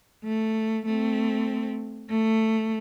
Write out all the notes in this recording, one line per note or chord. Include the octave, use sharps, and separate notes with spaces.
A3
A3 C4
A3